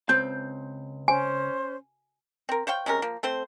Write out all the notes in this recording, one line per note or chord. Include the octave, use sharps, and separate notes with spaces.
C#2 C4 A5 G6
C#4 C5 G#5
C4 A#4
C5 C#5 F5 G5
C3 G#3 C#4 A#4
F3 A#3
A3 C4 C5